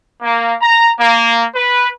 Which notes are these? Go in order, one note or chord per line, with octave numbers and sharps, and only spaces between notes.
A#3
A#5
A#3
B4